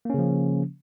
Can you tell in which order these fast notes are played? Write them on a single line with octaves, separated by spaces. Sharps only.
A#3 C#4 C#3 F3